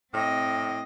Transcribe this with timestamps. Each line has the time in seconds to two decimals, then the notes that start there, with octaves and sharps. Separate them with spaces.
0.14 A2 C4 D#5 G5